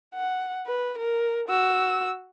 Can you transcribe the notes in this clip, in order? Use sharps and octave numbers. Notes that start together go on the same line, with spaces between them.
F#5
B4
A#4
F#4 E6